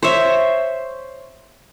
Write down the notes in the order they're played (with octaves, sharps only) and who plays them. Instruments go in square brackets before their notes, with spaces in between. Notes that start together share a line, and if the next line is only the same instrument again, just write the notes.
[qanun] C5 C#5 E5